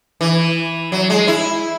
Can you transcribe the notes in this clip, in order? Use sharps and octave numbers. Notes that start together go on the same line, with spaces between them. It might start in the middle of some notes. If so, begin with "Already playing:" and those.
E3
F#3
G#3
E4